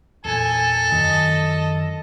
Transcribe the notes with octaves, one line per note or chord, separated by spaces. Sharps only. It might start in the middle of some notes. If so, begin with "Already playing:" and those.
E2 A#2 A4 G#5
F#2 D#3 D4 D#5 A5